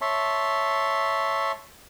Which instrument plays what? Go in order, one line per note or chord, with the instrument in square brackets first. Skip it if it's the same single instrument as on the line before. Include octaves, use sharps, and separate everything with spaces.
[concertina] C#5 E5 A5 C6